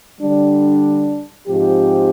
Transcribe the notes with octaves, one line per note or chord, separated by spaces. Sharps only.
D3 G3 D4
G#2 F3 C4 G4